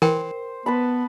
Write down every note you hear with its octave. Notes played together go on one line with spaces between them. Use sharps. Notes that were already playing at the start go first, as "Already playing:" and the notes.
E3 A#4 C5 G5
B3 B4 A5 B5